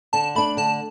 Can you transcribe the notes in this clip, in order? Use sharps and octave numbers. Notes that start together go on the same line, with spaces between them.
D3 A5
A3 D4 B5
D3 A5